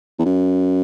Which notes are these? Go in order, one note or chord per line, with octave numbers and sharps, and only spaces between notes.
E2
F#2